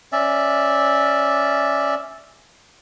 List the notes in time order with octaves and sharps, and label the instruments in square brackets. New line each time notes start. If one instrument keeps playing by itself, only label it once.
[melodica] C#4 D5 E5